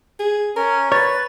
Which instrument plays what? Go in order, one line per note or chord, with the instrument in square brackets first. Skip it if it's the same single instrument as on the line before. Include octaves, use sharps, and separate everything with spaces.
[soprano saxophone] G#4
[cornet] C#4 [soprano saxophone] A#4
[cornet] B4 [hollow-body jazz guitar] C#5 [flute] A6